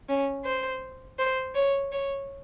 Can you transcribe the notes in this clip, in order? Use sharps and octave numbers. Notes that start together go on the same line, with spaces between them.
C#4
C5
C5
C#5
C#5